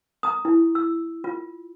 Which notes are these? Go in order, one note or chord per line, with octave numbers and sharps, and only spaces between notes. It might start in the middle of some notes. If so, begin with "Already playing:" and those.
A#5 D#6
E4
E6
F4